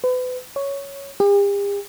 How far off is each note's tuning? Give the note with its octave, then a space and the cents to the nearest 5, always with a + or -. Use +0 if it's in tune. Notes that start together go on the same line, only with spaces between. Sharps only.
B4 +35
C#5 +5
G4 +45